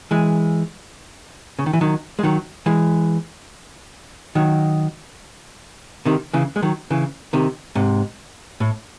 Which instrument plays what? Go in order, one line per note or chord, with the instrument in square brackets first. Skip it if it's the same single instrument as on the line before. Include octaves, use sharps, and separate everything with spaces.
[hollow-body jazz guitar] E3 G#3
C#3
D#3
E3
D#3 F#3
G#3
D#3 F#3
E3 G#3
D#3 F#3
C3 D#3
C#3 E3
G#3
D#3 F#3
C#3 E3
C3 D#3
G#2 C3
A2